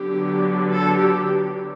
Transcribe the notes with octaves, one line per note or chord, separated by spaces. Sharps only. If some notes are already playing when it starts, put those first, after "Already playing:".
Already playing: D3 F#3 B3 D4 G4
A4
G4